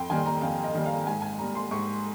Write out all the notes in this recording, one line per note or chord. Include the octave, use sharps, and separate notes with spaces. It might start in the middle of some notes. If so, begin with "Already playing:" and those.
Already playing: F2 G5 C6
D#3 G3 A#3 G#5
A#5
F2 F5
D#5
D#3 G3 A#3
F5
G#2 G#5
G#5
G3 A#3 A#5
C6
G#2 C#6